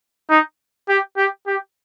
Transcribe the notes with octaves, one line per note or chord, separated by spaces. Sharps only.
D#4
G4
G4
G4